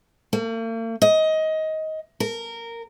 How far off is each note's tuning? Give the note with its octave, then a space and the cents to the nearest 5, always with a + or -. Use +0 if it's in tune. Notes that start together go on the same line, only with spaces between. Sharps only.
A#3 -45
D#5 +15
A#4 -15